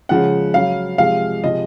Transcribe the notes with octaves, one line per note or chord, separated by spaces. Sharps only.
C#3 F3 G#3 F#5
C#3 F#3 F5
C3 F3 G#3 F5
C3 F3 G#3 D#5